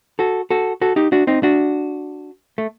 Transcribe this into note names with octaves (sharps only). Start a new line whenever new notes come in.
F#4 A4
F#4 A4
F#4 A4
D#4 G4
D4 F#4
C4 D#4
D4 F#4
A3